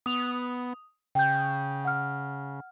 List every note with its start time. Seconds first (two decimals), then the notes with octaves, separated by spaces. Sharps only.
0.06 B3 D#6 F7
1.15 C#3 G5 G6
1.85 F#5 F6